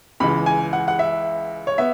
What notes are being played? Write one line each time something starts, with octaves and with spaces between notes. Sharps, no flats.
C#2 C#3 E3 G#3 B5
G#5
F#5
F#5
E5
C#5
B3 E5